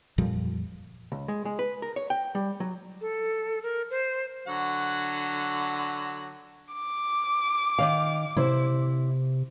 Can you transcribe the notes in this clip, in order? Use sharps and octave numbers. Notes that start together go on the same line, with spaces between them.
F2 A#2 F3 G3
C#2
G#3
G#3
B4
A#4
C#5
G5
G3
F#3
A4
A#4
C5
D3 F#3 F#5
D6
D#3 F5
C3 E4 C5